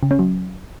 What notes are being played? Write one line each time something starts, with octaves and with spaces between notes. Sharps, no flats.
C#3
C#4
F#3